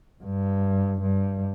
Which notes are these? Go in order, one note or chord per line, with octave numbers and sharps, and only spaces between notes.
G2
G2